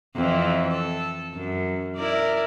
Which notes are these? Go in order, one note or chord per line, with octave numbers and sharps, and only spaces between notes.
F2 E3 E4
A4
F#2
E4 A#4 D5